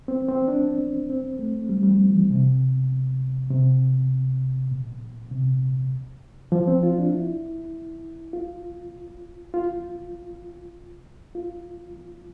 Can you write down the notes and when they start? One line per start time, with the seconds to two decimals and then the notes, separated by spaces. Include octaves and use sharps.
0.08 C4
0.28 C4
0.48 D4
1.10 C4
1.39 A3
1.69 G3
1.83 G3
1.89 F3
2.10 E3
2.30 C3
3.51 C3
4.71 A#2
5.31 C3
6.52 F3
6.67 C4
6.83 F4
6.98 D4
7.13 E4
8.33 F4
9.54 F4
11.35 F4